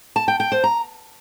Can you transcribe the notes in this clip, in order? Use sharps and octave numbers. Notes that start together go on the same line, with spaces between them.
A5
G5
G5
C5
A#5